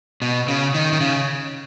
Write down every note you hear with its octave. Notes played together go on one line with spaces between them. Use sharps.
B2
C#3
D#3
D#3
C#3